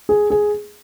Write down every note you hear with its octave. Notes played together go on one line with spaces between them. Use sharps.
G#4
G#4